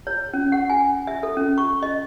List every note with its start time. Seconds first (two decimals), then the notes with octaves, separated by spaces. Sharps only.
0.07 C#5
0.33 C#4
0.52 F#5
0.70 G#5
1.07 E5
1.23 A4
1.37 C#4
1.58 C#6
1.83 D#5